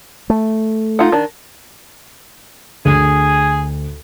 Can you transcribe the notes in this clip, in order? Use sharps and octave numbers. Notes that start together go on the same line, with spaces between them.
A3
D#4 F4 F#5
D#3 D4
D2 G#4